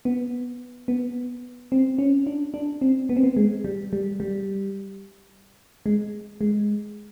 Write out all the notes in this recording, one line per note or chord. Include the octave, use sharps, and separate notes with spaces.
B3
B3
C4
C#4
D4
D4
C4
B3
C4
B3
G#3
G3
G3
G3
G#3
G#3